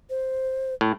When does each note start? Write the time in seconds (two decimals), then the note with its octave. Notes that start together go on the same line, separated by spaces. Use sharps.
0.10 C5
0.81 A2